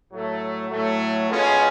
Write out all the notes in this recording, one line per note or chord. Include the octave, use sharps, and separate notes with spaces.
A2 F#3 A3
A2 F#3 A3
B2 G#3 C#4 F4